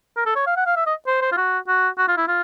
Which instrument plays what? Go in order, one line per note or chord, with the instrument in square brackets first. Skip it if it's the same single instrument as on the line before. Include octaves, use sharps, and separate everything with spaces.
[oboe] A#4
A4
C#5
F5
F#5
F5
E5
D#5
C5
C5
F4
F#4
F#4
F#4
F4
E4
F4